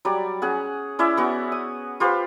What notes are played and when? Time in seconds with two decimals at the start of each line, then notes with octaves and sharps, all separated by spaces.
0.05 F#3 G3 D5
0.42 C#4 G#4 F#5
0.99 C#4 E4 D5 E5
1.17 B3 F#4
1.52 D#6
2.00 F4 G4 B4 C5